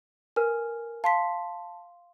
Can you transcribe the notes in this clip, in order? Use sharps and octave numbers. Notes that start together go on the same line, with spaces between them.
A#4 B4 G#5 F6
F5 A5 C6 B6